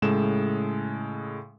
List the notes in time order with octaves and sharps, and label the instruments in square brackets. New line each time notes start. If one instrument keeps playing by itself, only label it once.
[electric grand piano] A2 C#3 G#3 A4 E7